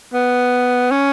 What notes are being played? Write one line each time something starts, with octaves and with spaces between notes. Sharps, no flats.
B3
C#4